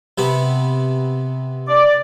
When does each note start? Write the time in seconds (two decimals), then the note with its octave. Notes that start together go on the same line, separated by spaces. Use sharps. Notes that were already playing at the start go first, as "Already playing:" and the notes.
0.18 C3 B3
1.68 D5